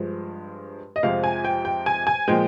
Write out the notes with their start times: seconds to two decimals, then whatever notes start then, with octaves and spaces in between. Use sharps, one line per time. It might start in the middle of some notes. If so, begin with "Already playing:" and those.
Already playing: G2 F3 G#3
0.96 D#5
1.03 F2 C3 F3 G#3 F5
1.24 G#5
1.45 G5
1.65 G5
1.86 G#5
2.07 G#5
2.28 A#2 F3 G#3 G5